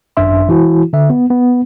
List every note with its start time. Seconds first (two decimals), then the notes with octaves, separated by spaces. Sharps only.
0.17 G#1 F#2 D4 E5 C6
0.48 E3 E4 F#4
0.93 D3 E5
1.10 B3
1.30 B3